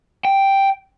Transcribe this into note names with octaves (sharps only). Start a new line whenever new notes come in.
G5